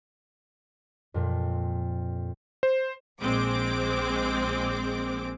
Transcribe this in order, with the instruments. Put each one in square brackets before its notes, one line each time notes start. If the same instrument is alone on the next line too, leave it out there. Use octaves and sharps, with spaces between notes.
[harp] F2 A#2
[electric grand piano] C5
[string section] A#1 G#3 C4 D6